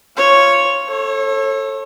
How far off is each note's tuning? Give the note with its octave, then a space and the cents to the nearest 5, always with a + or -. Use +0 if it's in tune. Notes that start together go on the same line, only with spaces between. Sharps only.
F4 -10 C#5 +0
A4 +5 C#5 -35